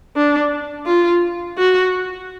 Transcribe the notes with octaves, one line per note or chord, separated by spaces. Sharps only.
D4
F4
F#4